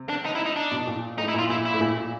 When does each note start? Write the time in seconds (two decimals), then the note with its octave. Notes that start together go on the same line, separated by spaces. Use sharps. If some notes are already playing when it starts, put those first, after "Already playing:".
Already playing: C3
0.09 D4
0.25 D#4
0.35 E4
0.46 D#4
0.56 D4
0.71 B2
0.87 A#2
1.18 A2 D#4
1.28 E4
1.34 A#2 F4
1.49 A#2 E4
1.65 E4
1.74 A2
1.81 A#2
1.97 A#2